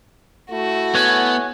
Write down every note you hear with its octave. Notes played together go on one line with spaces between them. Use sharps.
A3 E4 F#4
B3 C#5 F#5 G#5